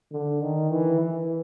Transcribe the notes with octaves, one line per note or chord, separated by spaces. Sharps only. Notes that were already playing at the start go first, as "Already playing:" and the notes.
D3
D#3
E3
E3